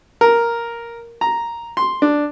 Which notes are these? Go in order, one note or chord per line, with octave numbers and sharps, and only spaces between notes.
A#4
A#5
C6
D4